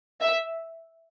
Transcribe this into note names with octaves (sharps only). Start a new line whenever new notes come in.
E5